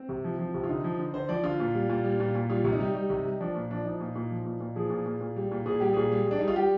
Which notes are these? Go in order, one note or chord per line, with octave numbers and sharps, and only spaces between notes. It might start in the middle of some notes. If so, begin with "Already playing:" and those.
Already playing: C4
C3
F3
F3
C3
F4
D3 D#4
F3
D3
D3 C5
F3 D5
D3 F4
A#2
G3
A#2
G3
A#2
A#2
G3 F4
C3
D#4
G3
G3
C3
G3
F3 D4
A#2
F3 D4
F3 D#4
A#2
A#2
F3
A#2
A#2
F3 G#4
A#2
A#2
A#2
G3
A#2
A#2 G#4
G3 G4
A#2 G#4
G3
G3 D4
G3 D#4
F4
G3 G4